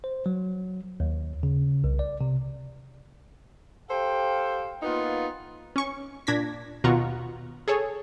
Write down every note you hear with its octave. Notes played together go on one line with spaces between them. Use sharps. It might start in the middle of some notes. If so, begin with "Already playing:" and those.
C5
F#3
D#2
C#3
C2
D5
C3
G4 A4 C5 F5 G5
A#3 B3 D#4 F4
C#4 C#6
A#2 D4 G#6 A#6 B6
D#2 B2 F4 F#5 A#5 C#6
G#4 A4 C#5